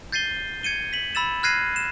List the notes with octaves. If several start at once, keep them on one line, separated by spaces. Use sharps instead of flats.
G6 A6 C7 D#7 G7
G#6 C#7 D#7 G7
B6 F#7
B5 E6 A6 E7
F6 F#6 G#6 A#6 C7 D#7
E7